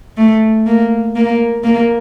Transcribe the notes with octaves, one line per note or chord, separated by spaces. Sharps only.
A3
A#3
A#3
A#3